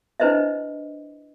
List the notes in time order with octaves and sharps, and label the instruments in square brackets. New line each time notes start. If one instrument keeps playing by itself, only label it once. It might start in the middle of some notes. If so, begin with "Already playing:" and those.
[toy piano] D4 E4 B4 C5 D#5 E5